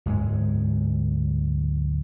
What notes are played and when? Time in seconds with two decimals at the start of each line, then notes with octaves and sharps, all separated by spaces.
0.06 D1 G#2 G#3